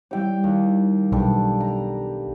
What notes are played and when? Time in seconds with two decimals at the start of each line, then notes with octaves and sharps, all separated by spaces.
0.11 G3 E4 G4 C#5 G5
0.44 D#2 A#3
1.12 B1 B2 G3 D4 A4
1.60 A#5